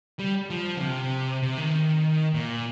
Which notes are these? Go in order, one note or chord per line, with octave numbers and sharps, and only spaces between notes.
G3
F3
D3
C3
C3
D#3
A#2